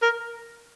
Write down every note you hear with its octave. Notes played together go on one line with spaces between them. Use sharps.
A#4